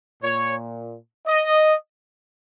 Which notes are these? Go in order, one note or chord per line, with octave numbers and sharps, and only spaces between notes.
A#2 C#5
D#5